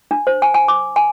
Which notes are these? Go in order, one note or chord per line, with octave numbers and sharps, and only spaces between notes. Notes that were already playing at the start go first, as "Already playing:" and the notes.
D4
C5
G#5
G#5
D6
G#5